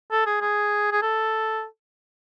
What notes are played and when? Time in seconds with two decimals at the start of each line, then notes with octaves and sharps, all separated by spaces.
0.11 A4
0.26 G#4
0.41 G#4
0.92 G#4
1.02 A4